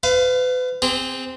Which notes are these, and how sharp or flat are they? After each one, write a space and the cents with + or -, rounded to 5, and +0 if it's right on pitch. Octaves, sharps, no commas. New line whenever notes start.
B4 +35 F5 +0
C4 -10 G#4 -35